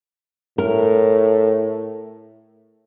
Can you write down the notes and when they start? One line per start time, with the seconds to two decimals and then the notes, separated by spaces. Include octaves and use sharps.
0.58 A2 A#4